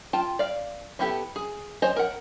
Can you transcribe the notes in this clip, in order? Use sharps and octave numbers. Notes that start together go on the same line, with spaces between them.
F4 G5 A5
D5 F5
G3 B3 E4 G4 A4
G#4
C5 C#5 D#5 G#5
A#4 F#5